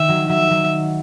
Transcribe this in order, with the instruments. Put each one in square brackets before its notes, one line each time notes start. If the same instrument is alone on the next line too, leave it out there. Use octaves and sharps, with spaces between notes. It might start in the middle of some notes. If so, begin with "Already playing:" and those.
Already playing: [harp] D#3 [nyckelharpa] E5
[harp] F#3
[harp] F#3 [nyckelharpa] E5
[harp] F#3